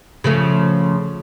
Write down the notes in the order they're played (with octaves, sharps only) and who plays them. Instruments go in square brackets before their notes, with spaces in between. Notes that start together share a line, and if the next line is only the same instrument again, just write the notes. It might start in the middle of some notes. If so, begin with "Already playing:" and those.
[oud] C#3 F3 A3